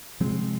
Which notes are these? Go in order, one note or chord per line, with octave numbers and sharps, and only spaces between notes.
C3 F3 G#3 C4